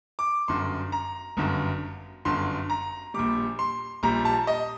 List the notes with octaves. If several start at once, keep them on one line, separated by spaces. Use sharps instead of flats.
D6
G1 F#2 D3 C6
A#5
G1 F#2 D3
G1 F#2 D3 C6
A#5
A#1 A#2 G3 D6
C6
A#1 A#2 G3 A#5
A5
D#5